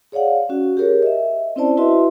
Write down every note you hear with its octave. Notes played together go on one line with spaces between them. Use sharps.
G#4 C#5 D5 F5 F#5
C#4 F#4
G4 G#4 A#4 C#5
D#5 E5
C4 C#4 E4 C5 D5 A5
E4 F#4 B4 D#5 E5 C6